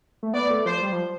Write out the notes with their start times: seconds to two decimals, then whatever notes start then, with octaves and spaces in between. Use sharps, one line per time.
0.23 A3
0.33 B3 D5
0.50 A3
0.66 F3 C5
0.82 G3
0.93 F3